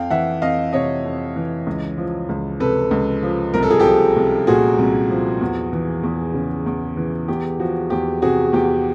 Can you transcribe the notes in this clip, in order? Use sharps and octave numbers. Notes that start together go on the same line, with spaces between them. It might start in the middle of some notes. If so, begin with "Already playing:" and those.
Already playing: F2 F5 G5
E3 E5 F#5
F2 D#5 F5
C3 C#5 D#5
F2
E3
C#2
F3
C#2
C3 A4 B4
C#2
F3
C2 A#4
A4
G#4
G4 A4
F3
C2
A#2 F#4 G#4
C2
F3
E2
E3
E2
C#3
E2
E3
E2 G4
F3 F#4
E2 G4
C3 F#4 G#4
E2 G4